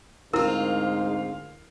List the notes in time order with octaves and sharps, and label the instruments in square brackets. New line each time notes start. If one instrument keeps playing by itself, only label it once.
[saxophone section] D2 F5 [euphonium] G#2 [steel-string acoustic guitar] C4 F4 [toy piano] E4 A#4